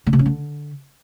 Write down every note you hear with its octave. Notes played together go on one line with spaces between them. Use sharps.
C#3
C3
C#4
D3